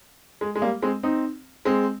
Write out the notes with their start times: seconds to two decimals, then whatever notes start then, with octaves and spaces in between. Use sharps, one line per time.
0.41 G#3
0.56 G#3
0.62 G3 A#3
0.83 G#3 C4
1.03 C4 D#4
1.65 G#3 C4